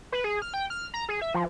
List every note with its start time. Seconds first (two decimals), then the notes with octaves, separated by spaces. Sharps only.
0.12 B4
0.24 G#4
0.42 F6
0.54 G5
0.70 F6
0.94 A#5
1.09 G#4
1.22 E5
1.35 F3